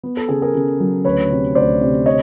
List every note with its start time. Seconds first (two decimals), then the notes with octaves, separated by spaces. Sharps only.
0.03 B3
0.17 A4
0.29 C#3 G#4
0.42 G#4 A#4
0.55 C#3
0.80 F#3
1.04 D2 B4 C#5
1.31 C3
1.55 D2 C5 D5
1.81 C3
2.06 C#5 D#5